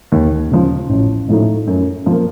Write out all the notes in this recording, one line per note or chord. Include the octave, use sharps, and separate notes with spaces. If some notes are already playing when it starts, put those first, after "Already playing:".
D#2
C#3 F3
A1
A2 F3 A3 D#4
F#2
F3 A#3